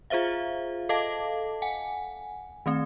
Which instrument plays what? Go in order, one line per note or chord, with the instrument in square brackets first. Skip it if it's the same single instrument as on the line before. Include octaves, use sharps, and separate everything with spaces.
[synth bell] F4 G#4 C5 E5 F5
A4 D#5 F5 A5 D6
F#5 G#5
D#3 A3 C4